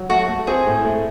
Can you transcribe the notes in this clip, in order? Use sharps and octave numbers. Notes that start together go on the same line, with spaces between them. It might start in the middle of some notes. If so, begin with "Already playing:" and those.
Already playing: F#3
A3 F#4
A3
C4 G#4
A2
A3